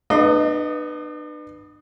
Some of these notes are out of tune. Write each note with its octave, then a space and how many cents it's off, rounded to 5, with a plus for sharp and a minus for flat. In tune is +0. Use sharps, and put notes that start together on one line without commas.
B3 +0 D4 +45 D#5 +0